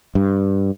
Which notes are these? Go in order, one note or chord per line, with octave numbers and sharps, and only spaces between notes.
G2